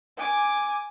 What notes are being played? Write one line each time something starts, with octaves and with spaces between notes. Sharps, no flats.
G#5 D6